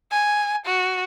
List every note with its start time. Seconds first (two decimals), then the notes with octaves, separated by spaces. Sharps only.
0.12 G#5
0.65 F#4